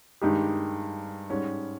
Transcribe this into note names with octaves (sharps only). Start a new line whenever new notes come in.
G2 D#3 G#3 D#4 G4
G#2 G3 C#4 G#4